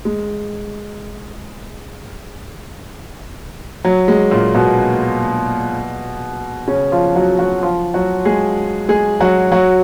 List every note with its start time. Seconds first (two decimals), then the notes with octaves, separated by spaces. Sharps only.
0.05 G#3
3.85 F#3
4.08 G#3
4.31 A#2 A#3
4.55 B2 B3
6.68 C#3 C#4
6.92 F3 F4
7.16 F#3 F#4
7.39 F#3 F#4
7.63 F3 F4
7.94 F#3 F#4
8.25 G#3 G#4
8.88 G#3 G#4
9.20 F#3 F#4
9.52 F#3 F#4